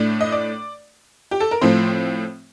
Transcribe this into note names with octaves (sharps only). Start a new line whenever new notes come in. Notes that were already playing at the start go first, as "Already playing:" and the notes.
Already playing: A2 A3 D4
D#5
D5
G4
A4
A#4
A2 F3 A3 C4 C5